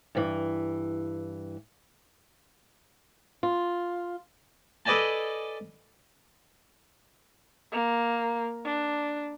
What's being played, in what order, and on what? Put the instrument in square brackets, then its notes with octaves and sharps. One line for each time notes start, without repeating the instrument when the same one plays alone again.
[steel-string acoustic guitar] G2 E3
F4
[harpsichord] A4 B4 D5 D#5 G#5 A5
[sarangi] A#3
D4